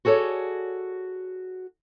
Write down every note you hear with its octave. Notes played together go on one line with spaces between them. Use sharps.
F#4 G#4 A4 C#5 D5